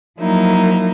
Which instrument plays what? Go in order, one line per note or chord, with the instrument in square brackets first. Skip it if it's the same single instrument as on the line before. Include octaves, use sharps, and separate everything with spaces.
[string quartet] F3 F#3 A#3 D#4 E4